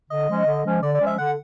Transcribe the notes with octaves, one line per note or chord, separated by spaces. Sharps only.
D3 D#5
F3 G#3 C#4
D3
F3 G#3 C#4
D3 D5
D5
F3 G#3 C#4
E5
D3 F#5